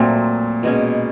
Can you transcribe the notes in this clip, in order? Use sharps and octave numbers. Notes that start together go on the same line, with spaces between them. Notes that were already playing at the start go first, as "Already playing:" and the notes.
Already playing: A#2 F#3 A3 C4
B2 G#3 C#4